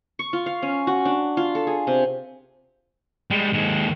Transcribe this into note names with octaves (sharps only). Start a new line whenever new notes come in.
C#6
F4
F5
C#4
F#4
D4
F4
A4
G#4
C3
G3 G#3
D#2 G#3